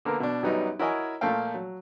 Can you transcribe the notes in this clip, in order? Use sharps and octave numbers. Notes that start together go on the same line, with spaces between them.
D3 A#3 B3 A#4
B2 D4
F#2 F#3 G3 B3 D#4
E4 F#4 A#4 C#5 D#5 G#5
A#2 F3 A3 A#3 F5 G5
F#3